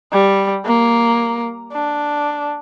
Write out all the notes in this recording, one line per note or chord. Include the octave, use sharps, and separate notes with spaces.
G3
A#3
D4